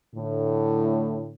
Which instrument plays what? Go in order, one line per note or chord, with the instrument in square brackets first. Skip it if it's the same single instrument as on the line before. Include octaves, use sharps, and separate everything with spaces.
[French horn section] A2 D3